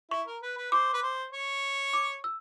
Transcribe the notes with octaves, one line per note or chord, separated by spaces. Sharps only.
E4 C#6
A#4
B4
B4
C5 D6
B4
C5
C#5
D6
E6